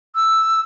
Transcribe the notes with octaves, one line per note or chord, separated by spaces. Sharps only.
E6